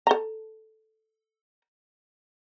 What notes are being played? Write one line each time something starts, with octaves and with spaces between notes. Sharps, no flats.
A4 A#5